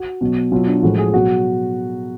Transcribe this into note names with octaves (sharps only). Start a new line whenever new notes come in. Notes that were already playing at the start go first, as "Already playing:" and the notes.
Already playing: F#4
B2 F#3
B2 F#3 F4
D4
A2 F3 G#3 F#4
G#4
G#4
B2 F#3 F#4